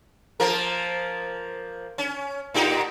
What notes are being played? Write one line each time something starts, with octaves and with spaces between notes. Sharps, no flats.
F3 A#3 A#4
C#4
A2 D#4 G4